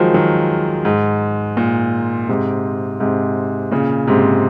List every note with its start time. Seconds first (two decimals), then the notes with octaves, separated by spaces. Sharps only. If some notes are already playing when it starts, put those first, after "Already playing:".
Already playing: D#3 F3 F#3 G#3
0.14 D#3 F#3
0.85 G#2
1.57 A#2
2.28 G#2 C3
3.00 G#2 C3
3.72 A#2 C#3
4.07 G#2 C3